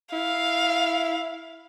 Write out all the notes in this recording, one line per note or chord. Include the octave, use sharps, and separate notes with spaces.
E4 F5